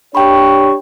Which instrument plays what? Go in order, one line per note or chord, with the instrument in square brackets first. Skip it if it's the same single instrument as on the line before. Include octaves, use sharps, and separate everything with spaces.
[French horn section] D4 G4 C#5 [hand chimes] G5 B5 [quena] C#6